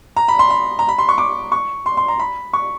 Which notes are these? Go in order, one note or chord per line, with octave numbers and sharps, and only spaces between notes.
A#5
B5
C6
B5
A#5
B5
C6
C#6
D6
C#6
C6
C6
A#5
B5
C#6